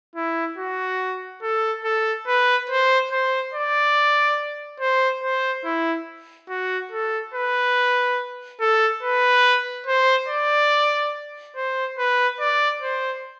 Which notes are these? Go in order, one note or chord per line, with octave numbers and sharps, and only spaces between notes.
E4
F#4
A4
A4
B4
C5
C5
D5
C5
C5
E4
F#4
A4
B4
A4
B4
C5
D5
C5
B4
D5
C5